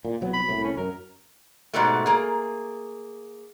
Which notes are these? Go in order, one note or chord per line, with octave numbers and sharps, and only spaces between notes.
A#2
C2 F#3 B3
B5
C2 A2
C#4
F#2 A#4
G#2 B2 G3 A3
A#3 G#4